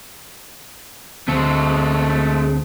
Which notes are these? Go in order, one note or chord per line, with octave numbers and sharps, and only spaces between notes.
D2 G#3 A3 C4